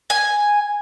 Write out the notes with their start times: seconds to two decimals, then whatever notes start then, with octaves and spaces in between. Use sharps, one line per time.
0.10 G#5